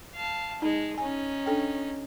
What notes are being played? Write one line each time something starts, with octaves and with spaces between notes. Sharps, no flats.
F5 A5
G#3 D#4
C#4 D#4 G#5
D4 A4 G5